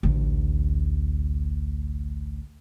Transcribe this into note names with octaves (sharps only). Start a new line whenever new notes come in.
A1 D2